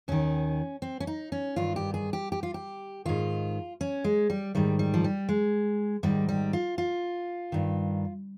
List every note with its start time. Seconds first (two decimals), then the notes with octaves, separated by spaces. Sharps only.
0.08 D#2 D#3 C#4
0.82 C4
1.00 C#4
1.07 D#4
1.32 C#4
1.56 G2 D#3 F4
1.76 G4
1.94 G#4
2.13 G4
2.32 G4
2.43 F4
2.54 G4
3.05 G#2 D#3 F4
3.81 C#4
4.04 G#3
4.30 G3
4.55 G#2 D#3 G3
4.79 G3
4.94 F3
5.04 G3
5.29 G#3
6.03 G#2 D#3 G3
6.29 G3
6.53 F4
6.78 F4
7.52 G2 D#3